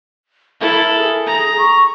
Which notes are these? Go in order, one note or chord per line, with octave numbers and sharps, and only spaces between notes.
E4 A4 A#4
G#4
A#5
C#6